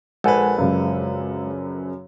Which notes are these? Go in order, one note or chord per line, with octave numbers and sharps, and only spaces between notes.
A#1 G#3 A4 B4 F#5 G#5
F#2 C#3 G#3 F5